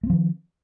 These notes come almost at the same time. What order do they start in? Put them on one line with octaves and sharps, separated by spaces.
A3 C4 F3 D#3